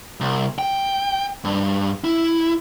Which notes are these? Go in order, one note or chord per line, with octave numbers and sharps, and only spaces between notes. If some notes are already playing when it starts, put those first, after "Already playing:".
C2
G5
G2
E4